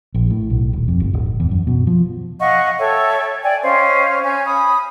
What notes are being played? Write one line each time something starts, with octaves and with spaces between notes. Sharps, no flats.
A#1
A2
B1
D#1
F2
G1
D1
E2
F#2
B2
F3
D#5 F5 F#5 C#6
A4 C#5 E5 G5
D5 G5 G#5
C#4 C5 D#5 F5
C#4 G#5 G6
B5 D#6